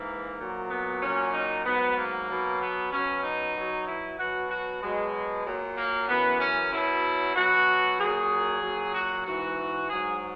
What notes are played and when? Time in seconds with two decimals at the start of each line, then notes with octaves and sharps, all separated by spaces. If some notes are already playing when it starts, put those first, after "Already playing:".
Already playing: G#2 E3 A#3
0.39 A#2 F#3
0.70 B3
1.02 A#2 F#3 C#4
1.33 D#4
1.65 G#2 F#3 B3
1.97 A#3
2.29 B2 F#3
2.61 B3
2.92 B2 F#3 C#4
3.24 D#4
3.56 B2 F#3
3.87 E4
4.19 B2 F#3 F#4
4.51 F#4
4.82 B2 F#3 G#3
5.46 A#2 F#3
5.77 A#3
6.09 F#2 E3 B3
6.41 C#4
6.73 B2 F#3 E4
7.36 B2 F#3 F#4
7.99 A#2 F#3 G#4
8.63 A#2 F#3
8.95 F#4
9.26 G#2 E3 F#4
9.90 G#2 F#3 G#4